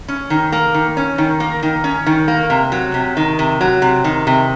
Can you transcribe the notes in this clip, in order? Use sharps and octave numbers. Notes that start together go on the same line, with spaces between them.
C#4
D#3
A#3
D#3
C#4
D#3
A#3
D#3
C#4
D#3
A#3
C3
F#3
C3
D#3
C3
F#3
C3
D#3
C3